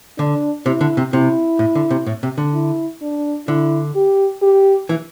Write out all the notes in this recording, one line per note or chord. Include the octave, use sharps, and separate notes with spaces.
D3 D4
C3 E4
D3
C3
C3 E4
A2
D3
C3
A2
C3
D3
E4
D4
D3 E4
G4
G4
E3